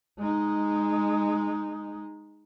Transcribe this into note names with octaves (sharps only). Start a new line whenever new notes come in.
G#3 D#4